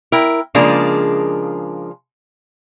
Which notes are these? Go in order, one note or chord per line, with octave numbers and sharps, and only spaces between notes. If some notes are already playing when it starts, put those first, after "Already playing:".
E4 A#4 G5
C#3 F3 G#3 A#3 D4 G#4